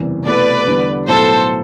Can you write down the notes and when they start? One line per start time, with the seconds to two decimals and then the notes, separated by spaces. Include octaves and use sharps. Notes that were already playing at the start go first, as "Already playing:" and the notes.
Already playing: F#1 E2 C3 E3 G3
0.25 C2 B2 A3 E4 B4 D5
0.67 E2 D3 G3 B3
1.07 B1 A2 F#3 B3 E4 A4 C5